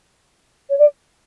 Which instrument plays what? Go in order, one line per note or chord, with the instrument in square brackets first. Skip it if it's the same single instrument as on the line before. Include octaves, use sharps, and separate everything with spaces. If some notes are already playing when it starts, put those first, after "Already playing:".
[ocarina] C#5
D5